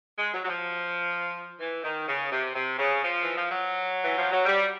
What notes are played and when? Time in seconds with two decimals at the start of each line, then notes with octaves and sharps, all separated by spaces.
0.17 G#3
0.33 F#3
0.43 F#3
0.48 F3
1.60 E3
1.83 D#3
2.07 C#3
2.31 C3
2.55 C3
2.79 C#3
3.02 F3
3.22 E3
3.36 F3
3.50 F#3
4.04 E3
4.18 F3
4.31 F#3
4.45 G3